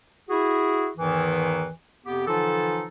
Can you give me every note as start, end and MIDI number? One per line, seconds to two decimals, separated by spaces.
0.29 0.89 64
0.29 0.89 66
0.29 0.89 68
0.97 1.69 40
0.97 1.69 44
0.97 1.69 51
0.97 1.69 52
2.05 2.24 41
2.05 2.24 48
2.05 2.24 59
2.05 2.24 67
2.27 2.85 50
2.27 2.85 52
2.27 2.85 53
2.27 2.85 63
2.27 2.85 65
2.27 2.85 69